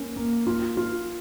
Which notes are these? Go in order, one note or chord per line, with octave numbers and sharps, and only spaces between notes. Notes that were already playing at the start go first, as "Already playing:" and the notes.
Already playing: A#3 C#4
A#3
F4
F4